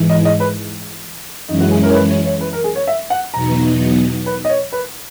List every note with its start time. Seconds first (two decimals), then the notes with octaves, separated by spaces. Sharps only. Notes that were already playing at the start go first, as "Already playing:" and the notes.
Already playing: G#2 E3 G#3
0.09 D#5
0.25 D#5
0.40 B4
1.48 F#2 E3 G#3 C#4 D#4 E4
1.60 F#4
1.71 G#4
1.83 A#4
1.90 C#5
1.95 B4
2.10 C#5
2.25 C#5
2.41 B4
2.53 A#4
2.64 G#4
2.75 C#5
2.87 E5
3.10 F#5
3.34 E2 B2 F#3 B3 D#4 A#5
4.26 B4
4.45 D#5
4.49 C#5
4.72 B4